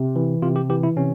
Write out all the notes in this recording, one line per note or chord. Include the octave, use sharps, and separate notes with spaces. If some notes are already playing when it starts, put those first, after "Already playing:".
Already playing: C3
E3
C3 F4
G4
E3 G4
E4
C3 C#4